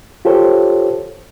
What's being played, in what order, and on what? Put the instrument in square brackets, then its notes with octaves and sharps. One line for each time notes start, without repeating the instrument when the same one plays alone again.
[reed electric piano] F4 G4 A4 C5 C#5